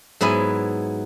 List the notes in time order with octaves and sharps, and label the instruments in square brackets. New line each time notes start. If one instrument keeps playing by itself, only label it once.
[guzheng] G#2 F#3 B3 E4 G#5